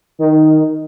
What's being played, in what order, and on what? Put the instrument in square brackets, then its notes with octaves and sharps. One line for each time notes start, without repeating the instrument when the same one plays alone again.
[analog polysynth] D#3